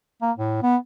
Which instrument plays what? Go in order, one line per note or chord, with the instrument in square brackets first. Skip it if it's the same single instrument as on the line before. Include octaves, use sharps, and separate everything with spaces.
[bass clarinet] A#3
A2
B3